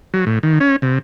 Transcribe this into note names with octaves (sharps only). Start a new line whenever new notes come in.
F#3
A2
D#3
C#4
C3